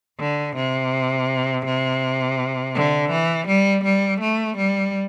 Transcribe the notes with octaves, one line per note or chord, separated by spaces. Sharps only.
D3
C3
C3
D3
E3
G3
G3
A3
G3